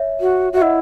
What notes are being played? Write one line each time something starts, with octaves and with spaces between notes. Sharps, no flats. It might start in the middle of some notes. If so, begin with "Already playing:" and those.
Already playing: C#5 E5
F#4
F#4 E5
E4 D#5 F#5